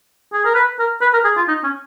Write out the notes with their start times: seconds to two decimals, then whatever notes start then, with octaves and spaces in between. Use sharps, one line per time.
0.33 G#4
0.45 A#4
0.55 B4
0.79 A#4
1.02 B4
1.14 A#4
1.25 G#4
1.37 F4
1.48 D#4
1.64 C#4